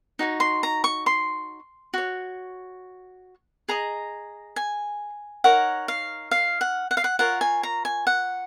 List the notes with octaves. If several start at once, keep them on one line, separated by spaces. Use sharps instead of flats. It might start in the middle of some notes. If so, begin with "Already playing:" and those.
D#4 F#4 C#5
C6
A#5
C#6
C6
F#4 C#5
G#4 D#5 A#5
G#5
D#4 A#4 C#5 F#5
F5
F5
F#5
F#5
F5
F#5
F4 A#4 C#5 F#5
G#5
A#5
G#5
F#5